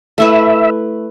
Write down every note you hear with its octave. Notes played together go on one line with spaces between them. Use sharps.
A3 E4 B4 E5